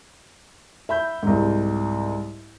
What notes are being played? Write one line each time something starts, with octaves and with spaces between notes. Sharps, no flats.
E5 B5 G6
C2 G#2